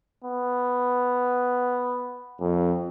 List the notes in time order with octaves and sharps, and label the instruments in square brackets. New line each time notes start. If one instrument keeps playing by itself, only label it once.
[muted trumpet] B3
[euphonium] F2